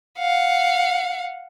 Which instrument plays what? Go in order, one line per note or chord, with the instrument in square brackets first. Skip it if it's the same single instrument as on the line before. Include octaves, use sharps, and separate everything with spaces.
[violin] F5 F#5